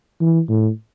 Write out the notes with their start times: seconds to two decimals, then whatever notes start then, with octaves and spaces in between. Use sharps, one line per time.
0.21 E3
0.49 A2